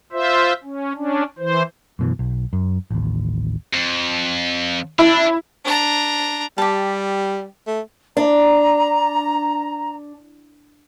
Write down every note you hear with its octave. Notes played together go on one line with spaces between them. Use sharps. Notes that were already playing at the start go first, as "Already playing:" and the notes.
F4 C5 E5
C#4
C#4 D4
E3 C5
F#2 B2 E3
B1
F#2
A1 D#2
F2
D4 E4
D4 A#5
G3 G4 A5
A3
D4 A#5